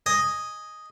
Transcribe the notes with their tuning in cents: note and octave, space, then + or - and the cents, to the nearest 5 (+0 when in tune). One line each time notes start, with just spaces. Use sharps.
D#5 +0 G#5 +0